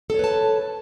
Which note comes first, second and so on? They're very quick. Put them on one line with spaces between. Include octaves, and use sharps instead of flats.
A4 C#5 B4 A5